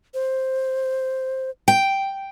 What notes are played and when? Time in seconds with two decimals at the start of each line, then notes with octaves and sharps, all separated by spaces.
0.14 C5
1.68 G5